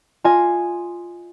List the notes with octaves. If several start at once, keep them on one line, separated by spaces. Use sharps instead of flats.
F4 D#5 G#5